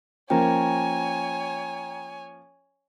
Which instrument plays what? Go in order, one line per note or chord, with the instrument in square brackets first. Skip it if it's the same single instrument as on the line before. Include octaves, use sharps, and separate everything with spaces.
[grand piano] F3 A#3 C#4 [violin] C#5 G#5 [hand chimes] G5 A#5